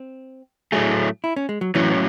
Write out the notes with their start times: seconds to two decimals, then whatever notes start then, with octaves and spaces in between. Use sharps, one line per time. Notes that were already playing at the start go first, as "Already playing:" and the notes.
Already playing: C4
0.72 A2 F#3 A3 G#4
1.24 E4
1.36 C#4
1.49 G#3
1.61 F#3
1.75 A2 E3 F#3 C#4